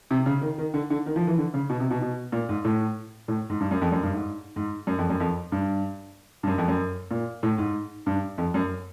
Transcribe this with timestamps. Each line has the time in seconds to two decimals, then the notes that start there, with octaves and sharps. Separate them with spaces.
0.11 C3
0.26 C#3
0.41 D#3
0.58 D#3
0.74 D3
0.90 D3
1.06 D#3
1.16 F3
1.27 E3
1.38 D3
1.54 C#3
1.69 B2
1.80 C3
1.90 B2
2.01 B2
2.32 A#2
2.49 G#2
2.65 A2
3.28 A2
3.50 G#2
3.60 G2
3.71 F#2
3.81 F2
3.92 F#2
4.03 G2
4.14 G#2
4.56 G#2
4.87 F#2
4.98 F2
5.10 F#2
5.20 F2
5.52 G2
6.43 G2
6.47 F#2
6.58 F2
6.68 F#2
7.11 A#2
7.43 A2
7.58 G#2
8.06 G2
8.38 F2
8.54 F#2